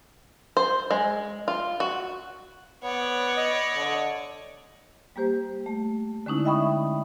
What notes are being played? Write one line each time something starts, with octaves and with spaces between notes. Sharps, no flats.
C5
G#3
F4
F#4
B3 C#5 D5
D#5
D3
G3 A#3 G4 C5
A3
D3 G#3 C#4 D#4 E4
D#5 E5 G5 B5 C#6 D#6